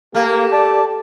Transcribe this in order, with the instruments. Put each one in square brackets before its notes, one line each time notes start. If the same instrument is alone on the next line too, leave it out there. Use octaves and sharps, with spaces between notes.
[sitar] A3 [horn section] A#3 [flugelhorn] G4
[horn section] A4 D5 [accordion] A5